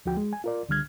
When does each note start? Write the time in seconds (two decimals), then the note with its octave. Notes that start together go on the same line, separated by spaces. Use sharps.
0.05 D2 F3 F#4 G5
0.17 G#3
0.33 G#5
0.44 F4 A#4 D5
0.69 C#2 D3 G3 F6 G#6